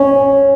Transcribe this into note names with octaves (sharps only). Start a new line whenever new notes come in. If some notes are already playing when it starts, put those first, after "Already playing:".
Already playing: C#4